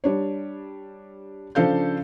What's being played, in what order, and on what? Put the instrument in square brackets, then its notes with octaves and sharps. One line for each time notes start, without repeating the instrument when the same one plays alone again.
[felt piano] G3 D4 C#5
C#3 F3 D4 A4 F5 G6